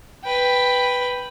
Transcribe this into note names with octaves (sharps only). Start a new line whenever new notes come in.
B4 G5